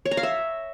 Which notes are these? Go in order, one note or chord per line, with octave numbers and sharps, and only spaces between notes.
C#5
A#5
F5
E5